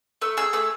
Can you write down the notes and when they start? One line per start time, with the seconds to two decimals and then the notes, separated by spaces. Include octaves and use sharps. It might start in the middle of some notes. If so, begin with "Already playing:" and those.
0.22 A3 E6
0.37 G#4 E6
0.53 A3 E6